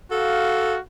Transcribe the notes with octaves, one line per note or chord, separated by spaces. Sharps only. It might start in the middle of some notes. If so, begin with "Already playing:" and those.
F#4 A4 F5